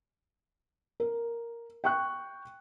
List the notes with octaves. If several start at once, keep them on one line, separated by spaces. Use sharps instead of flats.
A#4
G5 C#6 F#6